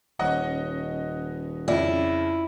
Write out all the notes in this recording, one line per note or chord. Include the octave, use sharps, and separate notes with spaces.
D#1 C#4 D#5 F#5
F2 C#3 E4 F4 D5